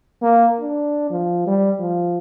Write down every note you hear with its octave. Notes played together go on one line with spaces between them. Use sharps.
A#3
D4
F3
G3
F3